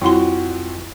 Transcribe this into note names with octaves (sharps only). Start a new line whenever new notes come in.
F2 G3 E4 F#4 C6